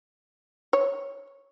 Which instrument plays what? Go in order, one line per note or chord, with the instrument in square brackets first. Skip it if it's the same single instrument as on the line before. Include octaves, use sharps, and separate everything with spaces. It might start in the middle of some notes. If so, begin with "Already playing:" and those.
[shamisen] C#5